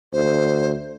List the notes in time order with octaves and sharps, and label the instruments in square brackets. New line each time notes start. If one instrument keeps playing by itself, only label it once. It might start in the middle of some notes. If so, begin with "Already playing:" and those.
[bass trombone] D2 [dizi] C5